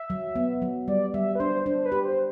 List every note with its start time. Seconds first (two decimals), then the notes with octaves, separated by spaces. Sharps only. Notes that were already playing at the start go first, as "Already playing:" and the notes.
Already playing: E5
0.10 F#3
0.36 B3
0.62 F#3
0.88 G3 D5
1.14 G3 E5
1.35 B4
1.40 D4 C5
1.66 D4 C5
1.78 C5
1.86 B4
1.92 G4
2.05 C5